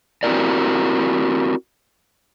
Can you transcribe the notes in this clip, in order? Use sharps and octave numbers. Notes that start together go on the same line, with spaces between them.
C4 E4 F#4 G4 A#4 D5